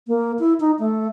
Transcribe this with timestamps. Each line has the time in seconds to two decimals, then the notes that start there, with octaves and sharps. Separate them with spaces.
0.08 A#3
0.39 E4
0.60 D#4
0.79 A3